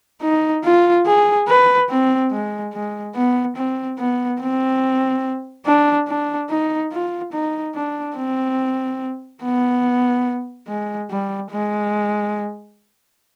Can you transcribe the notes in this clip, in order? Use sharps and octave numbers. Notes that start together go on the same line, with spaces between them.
D#4
F4
G#4
B4
C4
G#3
G#3
B3
C4
B3
C4
D4
D4
D#4
F4
D#4
D4
C4
B3
G#3
G3
G#3